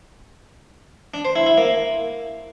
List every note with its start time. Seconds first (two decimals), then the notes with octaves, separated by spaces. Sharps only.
1.14 D4
1.25 C5
1.36 E4
1.46 E4
1.57 A#3